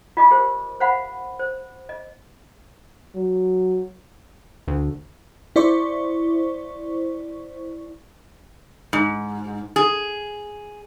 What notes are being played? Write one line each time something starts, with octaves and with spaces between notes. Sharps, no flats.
F4 D#5 D6
G4 A#4 C5
C5 F5 F#5 B5
C5
D#5
F#3
D2
E4 C5 D5 C#6
G#2
G#4